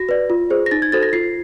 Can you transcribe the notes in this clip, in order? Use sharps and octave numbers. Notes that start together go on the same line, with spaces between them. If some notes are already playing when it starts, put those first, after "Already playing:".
Already playing: F#4 A#6
B4 D5
F4
G#4 C5
A#6
D#4 A6
G#6
F#4 A4 C5 A6
A#6
F4 C7